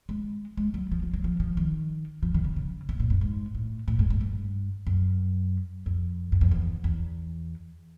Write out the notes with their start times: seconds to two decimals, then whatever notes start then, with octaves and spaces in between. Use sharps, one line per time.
0.09 G#3
0.57 G#3
0.74 F#3
0.92 F3
1.03 F3
1.14 F#3
1.24 F3
1.40 F3
1.57 D#3
2.23 F3
2.34 D#3
2.45 C#3
2.56 C#3
2.89 C3
3.00 A#2
3.10 G2
3.21 G#2
3.55 A2
3.88 A2
3.99 G#2
4.10 G#2
4.21 G2
4.87 F#2
5.86 F2
6.32 F#2
6.41 F2
6.51 E2
6.84 E2